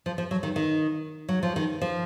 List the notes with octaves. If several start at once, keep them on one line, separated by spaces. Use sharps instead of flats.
F3
F3
F#3
D#3
D#3
F#3
F3
D#3
F3